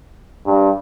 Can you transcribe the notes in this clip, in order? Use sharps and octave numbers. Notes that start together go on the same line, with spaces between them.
G2